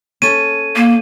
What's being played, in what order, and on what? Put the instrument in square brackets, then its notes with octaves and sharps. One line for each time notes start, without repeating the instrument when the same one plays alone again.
[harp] C#4 A4 [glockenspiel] D#7
[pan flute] A#3